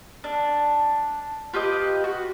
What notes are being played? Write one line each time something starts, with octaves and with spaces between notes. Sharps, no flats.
D4
F4 G4 B4 D#5
F#4